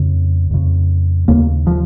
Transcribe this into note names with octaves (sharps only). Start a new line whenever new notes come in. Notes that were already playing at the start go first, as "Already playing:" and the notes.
Already playing: F2 C#3
F2 C#3
D#2 C#3 A#3
F3